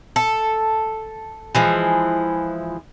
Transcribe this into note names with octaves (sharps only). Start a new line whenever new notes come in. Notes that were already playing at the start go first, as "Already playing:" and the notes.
A4
E3 F3 G#3